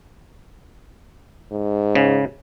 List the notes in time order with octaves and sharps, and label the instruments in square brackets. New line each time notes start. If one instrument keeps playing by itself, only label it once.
[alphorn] G#2
[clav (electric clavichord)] C#3